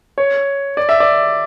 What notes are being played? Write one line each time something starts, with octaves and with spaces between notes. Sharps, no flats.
C#5
D5
E5
D5